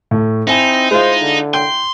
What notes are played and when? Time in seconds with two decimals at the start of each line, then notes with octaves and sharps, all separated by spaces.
0.11 A2 A3
0.47 C4 D#4 E4 G#5 E7
0.91 G#3 F4 C5
1.21 D3
1.54 G5 C6